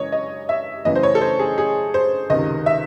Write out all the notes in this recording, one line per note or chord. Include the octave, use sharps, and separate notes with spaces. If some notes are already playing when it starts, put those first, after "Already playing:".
Already playing: F#2 C#3 E3 G#3 C#5 D#5
D#5
E5
F#2 C#3 E3 A3 D#5
C5
C#5
A4
C5
G#4
G#4
C5
C#2 C3 D#3 D#5
E5